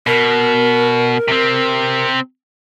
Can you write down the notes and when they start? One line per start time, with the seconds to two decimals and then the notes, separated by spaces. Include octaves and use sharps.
0.07 B2 A#4
1.28 C3 C4